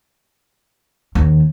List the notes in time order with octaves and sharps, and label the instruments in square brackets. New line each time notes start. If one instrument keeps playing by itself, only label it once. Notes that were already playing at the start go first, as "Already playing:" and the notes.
[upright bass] D#2